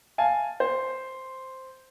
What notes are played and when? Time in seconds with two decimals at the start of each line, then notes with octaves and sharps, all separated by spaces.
0.18 F5 G#5 A5
0.60 C5